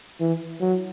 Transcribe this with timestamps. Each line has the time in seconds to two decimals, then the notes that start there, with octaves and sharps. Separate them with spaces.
0.20 E3
0.61 F#3